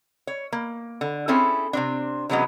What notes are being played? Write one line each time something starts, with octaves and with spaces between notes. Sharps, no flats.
C#5
A#3
D3
C4 C#4 E4 G#4 A4
C3 C4 D4
C3 E3 F#3 G#3 B3 C#4